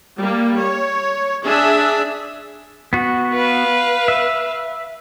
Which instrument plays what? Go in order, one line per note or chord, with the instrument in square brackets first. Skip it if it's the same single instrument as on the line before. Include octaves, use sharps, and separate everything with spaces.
[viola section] G3 A#3
C#5
D4 G#4 E5
[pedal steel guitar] B3 F#4
[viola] B4 F5
[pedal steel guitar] E5